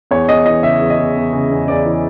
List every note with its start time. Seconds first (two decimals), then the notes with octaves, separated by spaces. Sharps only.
0.11 E2 C#5
0.29 E2 D#5
0.46 E3 D#5
0.63 C#3 E5
0.82 E2
0.90 D#5
0.99 E2
1.17 E2
1.33 C#3
1.51 E2
1.68 E2 D5
1.86 E3